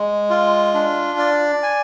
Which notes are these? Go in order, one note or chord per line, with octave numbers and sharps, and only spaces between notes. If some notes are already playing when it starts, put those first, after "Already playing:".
Already playing: G#3
F4
D4
D5
G#5